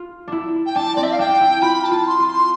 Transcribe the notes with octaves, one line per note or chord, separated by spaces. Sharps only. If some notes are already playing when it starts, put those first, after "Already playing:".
Already playing: F4
D4 E4
G5
D4 A5
C4 D5
E5
F5
D4 G5
E4
F4 B5
A5
F4
C6
F4
C6